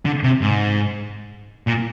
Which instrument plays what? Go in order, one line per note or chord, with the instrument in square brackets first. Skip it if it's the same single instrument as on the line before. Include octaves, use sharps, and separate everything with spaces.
[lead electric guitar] D3
C3
G#2
A#2